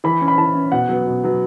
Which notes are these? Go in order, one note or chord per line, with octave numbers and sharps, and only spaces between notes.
E3 B5
C#4
B5
E3 A5
C#4
B2 F#5
F#3 B3
B2
F#3 B3